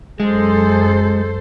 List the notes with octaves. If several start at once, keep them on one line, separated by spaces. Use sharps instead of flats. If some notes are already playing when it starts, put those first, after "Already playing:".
F#2 G#3 G#4 A4 C5